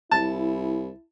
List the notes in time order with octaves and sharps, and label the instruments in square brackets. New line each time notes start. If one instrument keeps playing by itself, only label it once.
[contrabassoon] C2 [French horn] E4 [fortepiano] A5